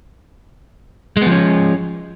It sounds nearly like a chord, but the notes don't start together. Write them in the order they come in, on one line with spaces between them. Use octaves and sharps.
G#3 B3 F3 C#4